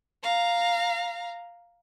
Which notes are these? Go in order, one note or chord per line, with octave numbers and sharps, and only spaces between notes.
F5 A#5